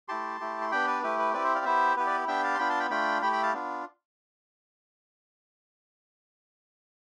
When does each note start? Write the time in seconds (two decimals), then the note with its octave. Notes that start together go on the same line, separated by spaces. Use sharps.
0.08 A3 E4 G4 A5 C6
0.40 A3 E4 G4
0.62 C6
0.71 B3 D4 G4 G5 B5
0.87 B4 D5
1.03 A3 E4 G4 B4
1.19 B4
1.34 C4 E4 G4 B4 D5
1.44 C5 E5
1.55 D5 F5
1.65 B3 E4 G4 C5 E5
1.96 B3 E4 G4 B4
2.07 B4 D5
2.27 B3 D4 G4 E5 G5
2.44 F5 A5
2.55 C6
2.59 B3 D4 F4 G5 B5
2.70 A5 C6
2.80 G5 B5
2.90 A3 D4 F4 G5 B5
3.22 A3 E4 G4 G5 B5
3.32 G5 B5
3.43 F5 A5
3.54 B3 D4 F4